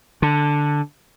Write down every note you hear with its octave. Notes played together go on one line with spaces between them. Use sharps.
D3